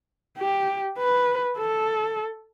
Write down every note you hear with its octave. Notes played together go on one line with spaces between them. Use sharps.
G4
B4
A4